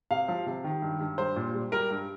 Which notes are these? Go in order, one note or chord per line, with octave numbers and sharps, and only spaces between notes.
C3 F5
F3
C3
D#3
G2
G2
G3 C5
A#2
G3
G3 A#4
G2